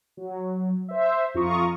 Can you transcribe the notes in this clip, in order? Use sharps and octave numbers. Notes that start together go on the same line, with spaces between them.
F#3
C5 E5
F2 F4 A#5 C#6 D#6